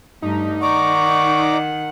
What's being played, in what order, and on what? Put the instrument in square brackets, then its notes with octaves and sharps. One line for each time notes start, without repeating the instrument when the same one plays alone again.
[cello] G2 A3 [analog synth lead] D#4
[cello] D#3 F#5 [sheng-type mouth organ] D5 A#5 D6 [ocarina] C#6